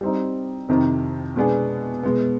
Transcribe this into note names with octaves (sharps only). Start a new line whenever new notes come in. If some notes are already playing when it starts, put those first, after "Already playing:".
G3 C4 D#4
F2 C3 D#3
B2 G#3 B3 D4 G#4
B2 G#3 B3